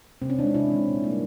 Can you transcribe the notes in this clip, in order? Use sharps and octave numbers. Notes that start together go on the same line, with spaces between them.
C3 C4
C#4
E3 G#3 D4 D#4
C3 E4
E3 G#3
A#2
G3 A#3